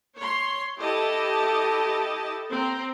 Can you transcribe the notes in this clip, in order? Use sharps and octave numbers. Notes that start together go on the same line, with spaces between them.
C#5 C6
E4 G4 A4 D#5 A5
C4 A#5